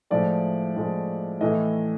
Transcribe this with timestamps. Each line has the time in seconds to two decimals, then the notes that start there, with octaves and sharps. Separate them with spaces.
0.10 A2 F3 G#3 D5
0.76 A2 F3 G#3
1.41 A2 E3 A3 D#5